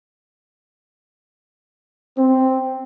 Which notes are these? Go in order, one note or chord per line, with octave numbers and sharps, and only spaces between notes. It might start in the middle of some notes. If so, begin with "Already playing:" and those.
C4